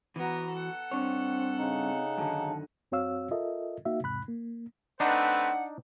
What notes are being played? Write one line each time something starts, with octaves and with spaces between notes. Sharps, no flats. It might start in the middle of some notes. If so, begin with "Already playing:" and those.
E3 B3 F#4 A#5
A4 F#5
G2 C4 D4 C#5
C#3 D#4
F#2 D3 D#3 A5
F#2 C4 F#4 C#5 F5 E6
F4 A4 A#4 D#5 E5
A#3 D#4 F#4 E5 F5
E2 G#2 C3 B5 F#6
A#3
A3 C4 D4 D#4 B4 F#5